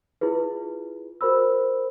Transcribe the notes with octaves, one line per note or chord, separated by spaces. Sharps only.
E4 F4 G#4 B4
F#4 A#4 C5 B5 E6